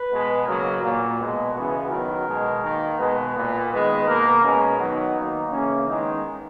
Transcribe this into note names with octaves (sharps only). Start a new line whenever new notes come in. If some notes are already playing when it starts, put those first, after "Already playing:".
Already playing: B4
B2 G#3 B3
C#3 F#3 A#3 A#4
A#2 A#3
B2 G#3 B3
C#3 E3 B3 F#4
D#3 F#3 B3 A#4
B2 G#3 B3
D#3 A#3
B2 G#3 B3 B4
A#2 A#3
D#3 G#3 B3 B4
B2 A#3 A#4
B2 G#3 B3 C#4
D#3 F#3 B3 D#4
D#3 A#3
C#3 E3 A#3 C#4
D#3 G#3 B3 D#4